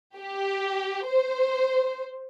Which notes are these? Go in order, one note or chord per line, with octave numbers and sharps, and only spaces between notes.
G4
C5